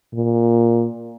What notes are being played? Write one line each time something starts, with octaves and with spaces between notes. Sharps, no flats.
A#2